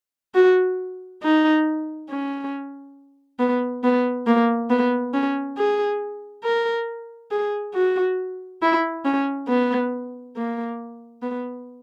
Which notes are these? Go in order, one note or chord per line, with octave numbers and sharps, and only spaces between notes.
F#4
D#4
C#4
B3
B3
A#3
B3
C#4
G#4
A#4
G#4
F#4
E4
C#4
B3
A#3
B3